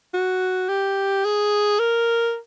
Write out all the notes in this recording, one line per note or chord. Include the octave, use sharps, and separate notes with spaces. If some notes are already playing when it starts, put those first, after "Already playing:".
F#4
G4
G#4
A#4